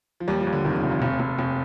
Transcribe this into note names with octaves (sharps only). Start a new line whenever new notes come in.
F3
D#2 G3
F3
D#2
D3
F1 D#3
D#3
F1
F3
F1
F1
F1